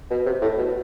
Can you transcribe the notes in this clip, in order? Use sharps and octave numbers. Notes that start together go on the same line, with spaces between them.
B2
C3
A2
B2